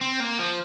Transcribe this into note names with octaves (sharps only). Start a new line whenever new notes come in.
C4
A#3
F3